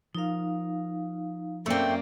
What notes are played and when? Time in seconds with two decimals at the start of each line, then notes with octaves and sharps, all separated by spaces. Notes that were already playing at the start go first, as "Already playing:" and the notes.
0.15 F3 D#4 A#4 F5
1.66 F#2 A3 A#3 C4 D5